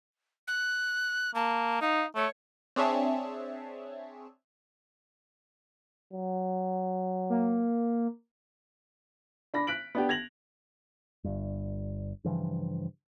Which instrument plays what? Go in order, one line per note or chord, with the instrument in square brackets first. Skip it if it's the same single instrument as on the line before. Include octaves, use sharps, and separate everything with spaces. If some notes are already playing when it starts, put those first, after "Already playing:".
[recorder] F#6
[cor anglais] A#3 [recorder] A5
[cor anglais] D#4 [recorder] F5
[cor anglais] A3 [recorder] C#5
[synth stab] C4 D4 G#4 C#5 E5 A5
[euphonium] F#3
[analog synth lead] A#3
[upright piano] D4 B5 A#6
F#6 B6 D7 F#7
B3 D4 G4
G#6 A#6 F7 F#7
[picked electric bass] G1 G2
G2 C#3 E3 F3